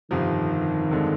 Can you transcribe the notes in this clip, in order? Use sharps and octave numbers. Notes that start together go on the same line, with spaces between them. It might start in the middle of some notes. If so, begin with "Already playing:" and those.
G1 F2 C3 D#3 F3
G1 F2 D3 G#3